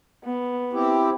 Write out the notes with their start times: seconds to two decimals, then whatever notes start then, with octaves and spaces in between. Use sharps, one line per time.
0.24 B3
0.73 C4 E4 G4